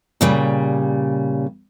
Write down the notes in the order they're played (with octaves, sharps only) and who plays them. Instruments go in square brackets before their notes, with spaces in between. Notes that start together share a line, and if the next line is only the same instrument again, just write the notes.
[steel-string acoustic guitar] A#2 C#3 G3